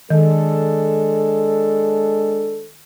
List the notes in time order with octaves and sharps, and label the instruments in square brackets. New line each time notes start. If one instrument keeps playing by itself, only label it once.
[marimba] D#3 [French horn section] G#3 D4 A4